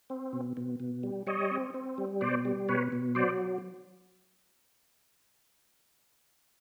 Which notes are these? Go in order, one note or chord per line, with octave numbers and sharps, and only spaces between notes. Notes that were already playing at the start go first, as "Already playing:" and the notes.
C4
B2
B2
B2
G3
G3 C#5 D#5
C4
C4
G3
B2 C5 D5
G3
B2 B4 C#5
B2
F#3 C5 D5